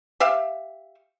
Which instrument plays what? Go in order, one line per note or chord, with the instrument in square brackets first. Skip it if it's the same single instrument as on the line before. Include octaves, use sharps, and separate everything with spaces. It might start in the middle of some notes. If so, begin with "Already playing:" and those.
[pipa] G4 E5 F5